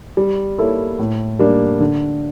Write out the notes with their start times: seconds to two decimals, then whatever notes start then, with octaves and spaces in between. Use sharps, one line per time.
0.17 G3
0.58 A#3 E4 A4 C#5
0.99 A2
1.39 G3 A#3 D4
1.80 D3